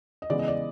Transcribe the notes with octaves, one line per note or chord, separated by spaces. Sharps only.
D#5
C#3 E3 G#3 B3 D5
D#5
D5